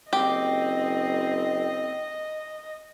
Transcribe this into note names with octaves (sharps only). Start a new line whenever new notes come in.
F#1 C4 G4 D#5